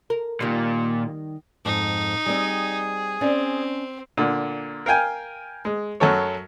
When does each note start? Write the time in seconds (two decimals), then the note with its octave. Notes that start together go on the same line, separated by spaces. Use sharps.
0.10 A#4
0.41 A#2 D#3 G3
1.65 F2 G#2 D#4
2.26 G3 C4 G#4
3.21 C4 C#4 C5 D5
4.17 A#2 D3
4.86 A#4 F5 G5 G#5
5.65 G#3
6.00 F#2 F#3 A4 C#5